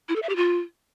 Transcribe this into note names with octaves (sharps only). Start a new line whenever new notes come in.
E4
A4
E5
G4
F4